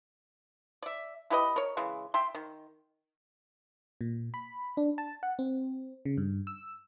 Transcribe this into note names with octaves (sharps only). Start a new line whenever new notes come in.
D5 E5
E4 G4 B4 D#5
A#4 C#5
C#3 E3 G#3
E5 G5 C6
D#3
A#2
B5
D4
A5
F#5
C4
C#3
G2
E6